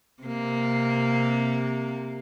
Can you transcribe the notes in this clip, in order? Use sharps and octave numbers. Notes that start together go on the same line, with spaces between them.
C3 A#3